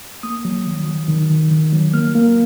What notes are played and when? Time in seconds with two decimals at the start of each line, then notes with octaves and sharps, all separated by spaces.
0.23 A#3 D#6
0.45 F#3
0.66 D#3
0.88 F#3
1.08 D#3
1.30 D#3
1.51 D#3
1.73 F#3
1.94 A#3 F6
2.15 A#3